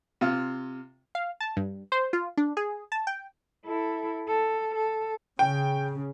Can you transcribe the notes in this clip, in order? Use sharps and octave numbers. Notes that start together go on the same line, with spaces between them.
C3 F4
F5
A5
G2
C5
F4
D4
G#4
A5
G5
E4 A4
A4
A4
C#3 G5